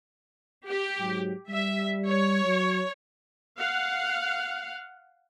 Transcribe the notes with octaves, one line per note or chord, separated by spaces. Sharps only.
G4
G#2 F#3
G3 E5
C#5
F#3
F5 F#5